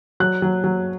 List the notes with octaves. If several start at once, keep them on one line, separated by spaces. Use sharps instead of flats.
F#3 F#6
F#3
F#3